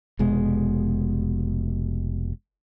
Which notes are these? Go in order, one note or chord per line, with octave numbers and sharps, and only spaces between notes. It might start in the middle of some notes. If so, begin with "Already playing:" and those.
F1 B2 G#3